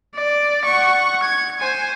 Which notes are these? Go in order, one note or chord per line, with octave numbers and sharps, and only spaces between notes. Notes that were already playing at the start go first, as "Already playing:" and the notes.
D5
F#5 C#6
G#6
C5 G#5